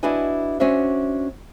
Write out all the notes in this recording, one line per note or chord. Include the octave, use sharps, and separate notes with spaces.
D4 E4 F#4 B4 D#5 G#5
C#4 D4 F#4 C5 E5